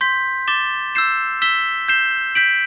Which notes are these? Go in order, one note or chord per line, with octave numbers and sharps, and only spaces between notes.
C6 G6 B6
D6 A6 E7 G7
E6 G6 C7 E7
E6 B6 E7 G7
G6 C7 E7 G7
G6 B6 D7 F#7